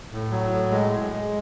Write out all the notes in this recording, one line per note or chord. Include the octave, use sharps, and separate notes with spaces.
A2
F#3
A2
G#3
G#3
G#3